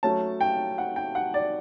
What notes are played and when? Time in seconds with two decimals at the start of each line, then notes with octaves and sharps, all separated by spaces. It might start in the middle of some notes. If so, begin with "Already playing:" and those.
0.03 F#3 A3 C#4 A5
0.41 G5
0.78 F#5
0.96 G5
1.15 F#5
1.34 D5